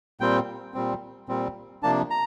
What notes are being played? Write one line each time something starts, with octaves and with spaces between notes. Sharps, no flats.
A#2 G3 C4 G5
A#2 G3 C4
A#2 G3 C4
C3 F3 A#3 D4 A5
A#5